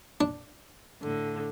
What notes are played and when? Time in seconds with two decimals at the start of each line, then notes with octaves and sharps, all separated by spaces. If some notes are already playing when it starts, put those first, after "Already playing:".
0.21 D4
1.01 A2 D3